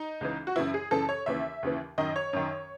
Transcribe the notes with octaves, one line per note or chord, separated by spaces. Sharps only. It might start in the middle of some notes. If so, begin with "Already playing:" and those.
Already playing: D#4
C#2 C#3 E3
F#4
F#2 C#3 E3 E4
G#4
F#2 C#3 E3 A4
C#5
D#2 C#3 E3 E5
D#2 C#3 E3
F#2 D#3 D#5
C#5
F#2 D#3